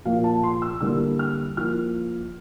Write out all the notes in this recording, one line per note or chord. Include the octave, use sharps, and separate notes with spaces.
A#2 F3 A#3 F5
A5
C6
E6
D3 G3 A#3 E4 E6
F6
F3 A#3 E4 F6